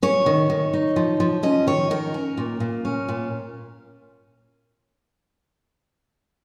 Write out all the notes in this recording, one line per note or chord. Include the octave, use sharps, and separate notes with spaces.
C#4 C#5
D#3
D#3
D#4
F3
F3
C#4 D#5
D#3 C#5
D#3 A#4
C#4
A#2
A#2
C#4
A#2